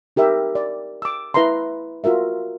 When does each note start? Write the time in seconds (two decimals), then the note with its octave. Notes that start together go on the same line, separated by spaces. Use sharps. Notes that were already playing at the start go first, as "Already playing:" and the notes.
0.16 D#4 G4 A#4 E5
0.55 D5
1.02 D6 E6
1.34 E4 B4 E5 A#5 C6
2.04 F4 F#4 A#4 E5